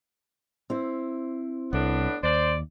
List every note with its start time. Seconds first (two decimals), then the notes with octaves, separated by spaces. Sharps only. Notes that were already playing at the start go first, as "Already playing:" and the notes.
0.70 C4 E4 C5
1.73 C2 A2 B3 D4
2.23 D#2 C5 D5